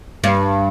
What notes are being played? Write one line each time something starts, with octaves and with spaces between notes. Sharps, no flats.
G2